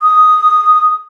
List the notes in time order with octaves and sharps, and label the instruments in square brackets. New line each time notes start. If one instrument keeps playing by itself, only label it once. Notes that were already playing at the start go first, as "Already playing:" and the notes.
[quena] D#6